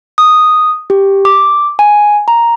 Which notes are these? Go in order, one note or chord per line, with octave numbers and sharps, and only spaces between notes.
D#6
G4
D6
G#5
A#5